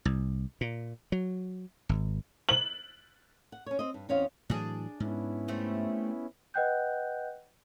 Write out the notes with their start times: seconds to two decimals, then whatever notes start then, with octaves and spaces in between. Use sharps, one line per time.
0.05 C2
0.61 A#2
1.12 F#3
1.89 G#1
2.49 F#7
3.52 F#5
3.66 C#4 C#5
3.79 C4 D#5
3.94 G2
4.09 E2 C4 C#4 C#5 D#5 F5
4.50 A2 E3 F#3 D4 G#4
5.00 G#2 B3 C#4 E4
5.48 G3 A3 C4
6.54 B4 D#5 F#5 G5 F#6 G6